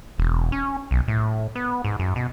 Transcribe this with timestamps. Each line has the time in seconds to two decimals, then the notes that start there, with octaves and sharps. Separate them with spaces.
0.18 E1
0.52 C#4
0.91 B1
1.08 A2
1.55 B3
1.85 G#2
1.99 F#2
2.16 B2